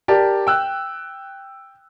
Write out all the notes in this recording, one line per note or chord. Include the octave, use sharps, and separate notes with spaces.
G4 A#4 D5 A5
G5 E6 F#6